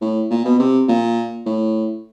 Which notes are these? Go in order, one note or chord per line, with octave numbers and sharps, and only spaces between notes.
A2
A#2
B2
C3
A#2
A2